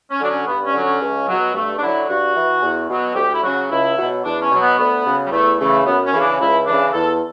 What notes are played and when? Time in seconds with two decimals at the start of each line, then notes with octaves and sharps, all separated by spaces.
0.10 C#4
0.20 D3 F#3 D4
0.29 C#4
0.46 G2 B3
0.64 C#4
0.73 D3 F#3
0.82 C#4
1.00 C#2
1.28 B2 F#3
1.53 G2 A3
1.77 D4
1.81 D3 F#3 E4
2.08 G2 F#4
2.34 E3
2.62 E2
2.88 B2 F#3
3.15 D2 G4
3.33 E4
3.42 C#3 F#3 F#4
3.70 C#2 E4
3.96 B2 F#3
4.24 E2 D4
4.41 C#4
4.50 B2 F#3
4.60 B3
4.77 D2 B3
5.05 C#3 F#3
5.26 G3
5.31 E2 A3
5.58 C#3 E3 A3
5.85 F#2 B3
6.04 C#4
6.12 C#3 E3
6.21 D4
6.39 C#2 E4
6.66 C#3 E3 D4
6.92 E2 A4